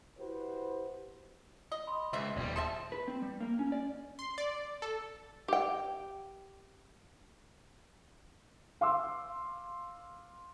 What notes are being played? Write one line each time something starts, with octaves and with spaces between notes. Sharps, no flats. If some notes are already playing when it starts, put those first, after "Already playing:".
E4 F#4 G4 B4 C5
D#5
B5 C6
C#2 C5 D#5 E5
D#1 B1 G3 D5
G#4 A4 C5 E5 A5 C6
B4
C4
G3
A#3
C#4
D5
C6
D5
A4
G4 G5
F5 C6 D6 E6